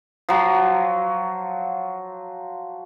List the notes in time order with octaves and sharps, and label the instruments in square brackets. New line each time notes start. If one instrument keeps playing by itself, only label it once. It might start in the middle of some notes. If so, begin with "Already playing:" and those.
[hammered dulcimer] F3 F#3